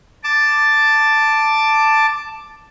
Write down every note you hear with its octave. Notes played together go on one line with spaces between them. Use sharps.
A5 D6